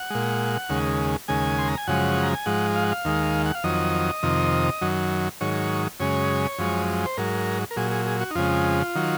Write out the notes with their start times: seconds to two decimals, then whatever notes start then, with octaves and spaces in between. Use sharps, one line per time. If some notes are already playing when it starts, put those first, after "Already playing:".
Already playing: F#5
0.10 A#2 G#3
0.69 D#2 C#3 G#3
1.28 D#2 C#3 G#3 G#5
1.58 C6
1.68 A#5
1.77 G#5
1.87 F#2 C#3 F3 G#3 F#5
2.23 A#5
2.34 G#5
2.46 G#2 F3 G#3 F#5
2.76 F5
2.83 F#5
2.92 F5
3.05 D#2 D#3 G#3
3.46 F#5
3.55 F5
3.64 F2 D#3 F#3 D#5
4.23 F2 C3 D#3
4.81 F#2 D#3 F#3
5.41 G#2 D#3 F#3 C#5
6.00 F#2 C#3 G#3 C#5
6.59 F#2 F3 G#3
7.05 C5
7.17 G#2 F#3 A#4
7.71 A#4
7.76 A#2 F#3 G#4
7.91 G#4
8.06 G#4
8.21 F#4
8.31 D#4
8.35 F2 C#3 G#3 F4
8.95 D#3 F#3